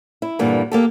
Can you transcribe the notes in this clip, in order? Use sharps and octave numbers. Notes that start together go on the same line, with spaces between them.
E4
G2 A#2 D3 E3
A#3 G4 A4